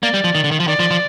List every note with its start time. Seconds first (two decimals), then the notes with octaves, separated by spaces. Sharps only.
0.02 A#3 D5
0.14 G3
0.24 F3
0.35 D#3
0.44 D3
0.51 D#3
0.60 F3
0.68 D#3 D5
0.80 F3
0.91 F3